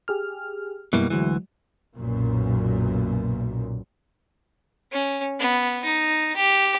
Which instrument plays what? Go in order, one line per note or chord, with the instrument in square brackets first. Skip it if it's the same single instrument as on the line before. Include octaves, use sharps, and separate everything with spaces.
[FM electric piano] G4 G#4 F6
[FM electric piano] F#2 E4 [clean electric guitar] B2 G3 A#3
[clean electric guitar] D2 E3 [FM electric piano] F#3 G#3
[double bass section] B1 F#2 A#2
[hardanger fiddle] C#4
B3
D#4
G4